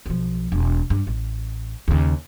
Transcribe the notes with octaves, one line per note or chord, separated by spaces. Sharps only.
B1 F3
E1
G2
A1
D#2 C#3